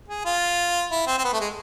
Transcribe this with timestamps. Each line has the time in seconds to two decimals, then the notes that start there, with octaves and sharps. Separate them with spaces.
0.08 G#4
0.25 F4
0.92 E4
1.07 C4
1.18 C4
1.24 B3
1.33 A3
1.40 G#3